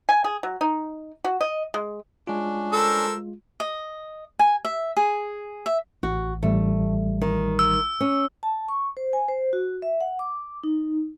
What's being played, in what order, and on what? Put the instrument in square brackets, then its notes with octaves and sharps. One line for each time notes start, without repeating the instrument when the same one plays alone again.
[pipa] G#5
G#4
F#3
D#4
F#4
D#5
G#3
[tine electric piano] G#3 F4 [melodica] C#4 D4
[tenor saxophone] A4 [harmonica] A#4 C5 E6
[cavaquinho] D#5
G#5
E5
G#4
E5
[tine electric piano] A1 [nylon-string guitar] F#4
[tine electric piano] A1 G3 [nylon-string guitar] A3
[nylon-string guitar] D#3
[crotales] E6
[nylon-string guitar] C#4
[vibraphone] A5
C#6
C5
G#5
C5
F#4
E5
F#5
D6
D#4